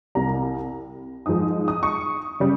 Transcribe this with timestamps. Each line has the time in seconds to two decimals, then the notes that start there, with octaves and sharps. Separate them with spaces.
0.15 C2 C3 G3 A#5
1.26 G#2 F3 G#3 D#6
1.68 D#6
1.83 C#6
2.40 C#3 G3